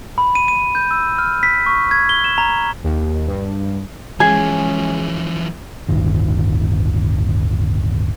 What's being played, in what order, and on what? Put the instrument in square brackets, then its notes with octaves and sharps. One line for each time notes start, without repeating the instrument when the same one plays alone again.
[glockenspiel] B5
D#7
D#7
G6
E6
F6
B6
C#6
G#6
G7
E7
A#5
[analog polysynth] D#2
G2
[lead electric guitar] E3 F3 [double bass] G#3 C#4 [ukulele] G#4
[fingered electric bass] D1 G1 D#3